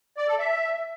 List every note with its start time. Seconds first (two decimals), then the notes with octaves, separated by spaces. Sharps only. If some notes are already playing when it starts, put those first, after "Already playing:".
0.17 D5
0.28 A4
0.39 E5